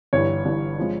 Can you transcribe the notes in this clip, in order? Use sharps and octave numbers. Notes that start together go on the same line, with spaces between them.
G1 G2 E3 C#5
G1 G2 E3
F3 G#3